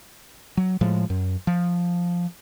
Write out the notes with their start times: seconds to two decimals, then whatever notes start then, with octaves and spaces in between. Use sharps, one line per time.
0.57 F#3
0.81 A2 F3 G#3
1.10 F#2
1.47 F3